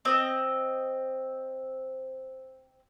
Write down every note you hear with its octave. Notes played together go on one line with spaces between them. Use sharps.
C4 D#5